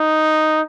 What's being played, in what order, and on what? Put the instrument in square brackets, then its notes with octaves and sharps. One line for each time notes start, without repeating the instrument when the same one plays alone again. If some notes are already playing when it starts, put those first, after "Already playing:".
Already playing: [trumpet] D#4